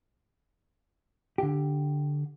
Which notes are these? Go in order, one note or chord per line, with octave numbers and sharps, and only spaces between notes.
D3 G4